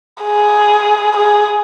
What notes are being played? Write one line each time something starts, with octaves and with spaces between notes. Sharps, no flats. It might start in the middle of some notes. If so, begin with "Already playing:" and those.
G#4
G#4